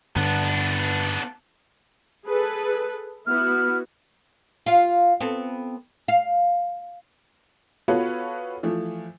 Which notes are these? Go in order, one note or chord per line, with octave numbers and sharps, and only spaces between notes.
G2 D3 B3 D4
G#4 A4 B4
B3 E4 F#4 F6
F4 F5
B3 C4 A4
F5
B3 F4 F#4 A4 B4 C#5
E3 F3 A3